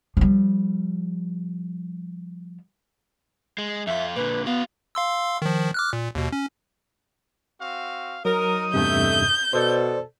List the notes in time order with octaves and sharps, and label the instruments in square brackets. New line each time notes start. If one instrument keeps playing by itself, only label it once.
[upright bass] F3 G3
[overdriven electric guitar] G#3
[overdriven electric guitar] F2 F4 [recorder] E5
[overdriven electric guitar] A#2 D3 [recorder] B4
[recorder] B3 [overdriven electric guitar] F#4 F5
[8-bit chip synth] F5 C6 E6
D#3 F3
D6 F6 F#6
A#2
D#2 B2
C#4
[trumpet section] C4 F#4 F5
[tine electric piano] F#3 [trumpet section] D#4 D#6 [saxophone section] A#4
[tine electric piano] E2 G2 C3 [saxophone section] A3 E5 [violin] G6
[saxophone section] B2 A4 [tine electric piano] C5 D5